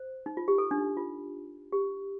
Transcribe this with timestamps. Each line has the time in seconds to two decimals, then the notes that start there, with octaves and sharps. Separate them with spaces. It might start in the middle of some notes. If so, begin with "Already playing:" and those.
Already playing: C5
0.26 D#4
0.37 F4
0.48 G4
0.58 A4
0.71 D4
0.78 D#4
0.97 F4
1.72 G4